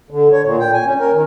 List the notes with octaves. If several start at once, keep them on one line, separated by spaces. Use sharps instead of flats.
D3
C#5
A#2
G5
G#5
C#4
A#4
D#3